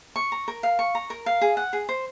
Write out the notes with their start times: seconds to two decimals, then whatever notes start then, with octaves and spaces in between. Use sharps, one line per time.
0.16 C#6
0.32 A#5
0.48 A#4
0.63 F5
0.79 C#6
0.95 A#5
1.10 A#4
1.26 F5
1.41 G#4
1.57 F#5
1.73 G#4
1.89 C5